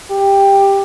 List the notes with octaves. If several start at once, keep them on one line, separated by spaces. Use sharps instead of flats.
G4